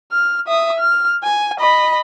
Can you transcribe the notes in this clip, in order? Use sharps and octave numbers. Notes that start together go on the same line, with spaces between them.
F6
E5 D#6
F6
G#5
D#5 B5